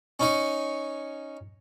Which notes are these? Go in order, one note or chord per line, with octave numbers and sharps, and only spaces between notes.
C#4 D#4 C#5